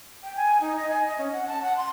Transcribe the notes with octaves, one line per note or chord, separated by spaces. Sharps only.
G5
G#5
D#4
D#5
G#5
D#5
C#4
F#5
A5
F#5
C6